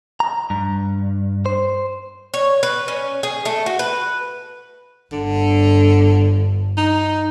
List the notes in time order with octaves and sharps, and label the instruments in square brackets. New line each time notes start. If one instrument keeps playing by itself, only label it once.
[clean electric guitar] A#5
G2
C5
[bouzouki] C#5
B4
C#4
G#4
A3
F#4
B4
[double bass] G1 [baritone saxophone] D3
[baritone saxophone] D#4